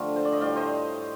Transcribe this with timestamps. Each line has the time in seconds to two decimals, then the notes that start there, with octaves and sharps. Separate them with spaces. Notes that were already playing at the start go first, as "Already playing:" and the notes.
Already playing: D3 F3 A3 F4 G4
0.16 C5
0.25 D5
0.33 D#5
0.41 A2 G3 D5 F5
0.56 C5 D#5